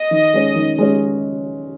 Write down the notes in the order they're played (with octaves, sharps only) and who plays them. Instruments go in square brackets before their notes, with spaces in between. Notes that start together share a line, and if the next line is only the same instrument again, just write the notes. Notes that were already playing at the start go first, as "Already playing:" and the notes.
Already playing: [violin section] D#5
[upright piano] D#3
G#3 C#4
D#3
G#3 C#4